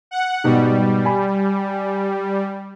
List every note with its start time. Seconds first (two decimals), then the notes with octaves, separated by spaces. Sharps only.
0.11 F#5
0.44 G#2 B2 G3
1.05 G#5 B5